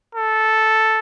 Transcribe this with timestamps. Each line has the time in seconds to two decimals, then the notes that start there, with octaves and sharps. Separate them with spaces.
0.15 A4